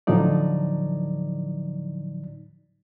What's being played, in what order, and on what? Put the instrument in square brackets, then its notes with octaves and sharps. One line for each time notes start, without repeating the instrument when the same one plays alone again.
[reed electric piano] A2 D3 F3 F#3 D#4 D5